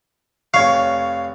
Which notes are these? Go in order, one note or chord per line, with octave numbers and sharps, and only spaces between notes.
F1 C#5 F5 C#6